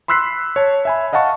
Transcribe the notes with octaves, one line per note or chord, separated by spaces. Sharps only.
B5 C6 E6 F#6 B6 C7
C#5 A5
E5 G#5 B5
D#5 F5 F#5 A5 C#6